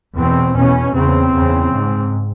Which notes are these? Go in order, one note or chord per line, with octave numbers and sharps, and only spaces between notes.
E2 B2 C4
E2 B2 C#4
E2 C#3 C4
E2 C#3
G#2